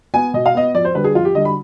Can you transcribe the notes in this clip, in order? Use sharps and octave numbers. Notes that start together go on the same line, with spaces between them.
B3 G#5
B2 D#5
F5
B3 D#5
F2 D5
C5
D3 G3 B4
G#4
F2 F4
G4
D3 G3 D#5
B5